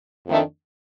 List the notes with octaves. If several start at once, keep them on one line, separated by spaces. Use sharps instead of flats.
F2 D#3 A3 D4